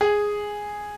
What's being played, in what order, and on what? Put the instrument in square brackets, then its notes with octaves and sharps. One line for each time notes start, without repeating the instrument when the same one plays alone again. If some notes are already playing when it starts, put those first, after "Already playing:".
[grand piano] G#4